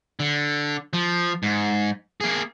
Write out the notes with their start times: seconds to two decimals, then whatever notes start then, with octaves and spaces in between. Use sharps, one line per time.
0.20 D3
0.93 F3
1.43 G#2
2.21 A#3 G#4